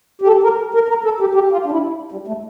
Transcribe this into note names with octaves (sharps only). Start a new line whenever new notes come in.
G4
A4
A#4
A#4
A#4
A4
G4
G4
F4
D4
E4
G3
A3